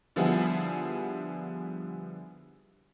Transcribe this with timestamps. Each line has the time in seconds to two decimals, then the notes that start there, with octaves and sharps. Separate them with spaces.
0.16 D3 F3 G3 B3 E4 G#4